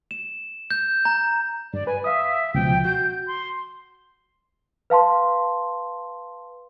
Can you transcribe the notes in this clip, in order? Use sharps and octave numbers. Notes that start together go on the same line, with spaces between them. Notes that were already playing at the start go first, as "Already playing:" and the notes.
E7
G6
A#5
G2 D5
B4 G#5
E5 F5 D#6
C#2 B2 F3 G5
F#4 G6
C6
B4 F5 A5 C6